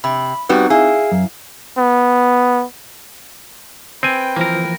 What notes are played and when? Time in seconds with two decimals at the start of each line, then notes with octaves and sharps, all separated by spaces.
0.04 C3 B5
0.49 G3 B3 C4 D#4 F#4
0.70 E4 G#4 F5
1.12 F#2
1.78 B3
4.03 C4 B4 G5 G#5
4.36 E3 F3 A#3 A#4